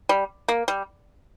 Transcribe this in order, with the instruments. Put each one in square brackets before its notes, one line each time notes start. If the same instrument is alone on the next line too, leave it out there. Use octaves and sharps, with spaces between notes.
[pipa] G3
A#3
G3